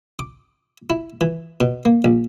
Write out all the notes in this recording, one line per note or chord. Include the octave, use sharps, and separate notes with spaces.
D6
E4
E3
B2
A#3
A#1